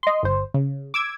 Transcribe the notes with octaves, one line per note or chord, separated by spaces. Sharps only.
D#5 C6
G1 C5
C#3
D6 E6 G#6